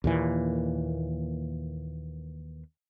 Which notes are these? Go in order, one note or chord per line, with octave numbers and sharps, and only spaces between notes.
D#2 A#2 E3